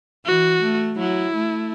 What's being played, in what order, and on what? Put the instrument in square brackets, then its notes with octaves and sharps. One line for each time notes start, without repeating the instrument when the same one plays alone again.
[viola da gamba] E3 [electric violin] F#4
[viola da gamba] A3
[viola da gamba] F#3 [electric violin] E4
[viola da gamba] A3